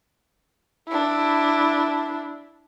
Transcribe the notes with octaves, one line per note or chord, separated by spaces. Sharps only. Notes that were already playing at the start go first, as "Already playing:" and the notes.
D4 E4